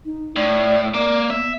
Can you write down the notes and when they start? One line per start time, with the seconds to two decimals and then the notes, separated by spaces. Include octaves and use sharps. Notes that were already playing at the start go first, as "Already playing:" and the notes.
0.05 D#4
0.36 A2 D5
0.94 A#3 D5
1.30 B3 E5